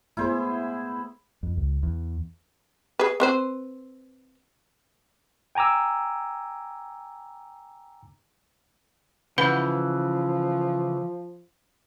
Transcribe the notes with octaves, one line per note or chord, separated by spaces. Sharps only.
A3 B3 E4 G#4 C5
F2
C#2
E2
G#4 B4
C4 B4 C5
G5 G#5 A#5 D6 E6
C#3 E3 F3 B4 F#5 B5